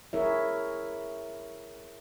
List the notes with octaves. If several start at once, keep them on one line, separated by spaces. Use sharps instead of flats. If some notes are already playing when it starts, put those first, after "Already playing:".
E4 G#4 A#4 C#5 E5